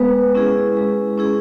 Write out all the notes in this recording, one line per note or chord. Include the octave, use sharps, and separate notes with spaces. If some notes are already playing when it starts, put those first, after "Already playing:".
Already playing: G#3 B3
C#4 E4 G#4
G#3
C#4 E4 G#4